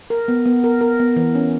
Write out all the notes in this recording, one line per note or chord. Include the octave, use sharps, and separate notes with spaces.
A#4
B3
B3
A#4
A#4
B3
E3
C#4